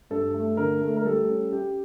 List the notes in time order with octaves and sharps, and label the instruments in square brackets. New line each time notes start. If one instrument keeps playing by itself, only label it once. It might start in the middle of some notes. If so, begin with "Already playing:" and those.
[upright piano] G2 A4
A3
D3 A#4
A3
A#4
G3 A4
C#4
C#4 G4